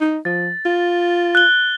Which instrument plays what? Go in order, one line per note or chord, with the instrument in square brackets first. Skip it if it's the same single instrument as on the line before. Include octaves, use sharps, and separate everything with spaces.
[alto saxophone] D#4
[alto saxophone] F3 [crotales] A6
[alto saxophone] F4
[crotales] F#6 G7